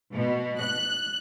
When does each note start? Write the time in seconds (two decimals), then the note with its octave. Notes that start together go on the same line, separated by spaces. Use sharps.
0.14 B2
0.60 F#6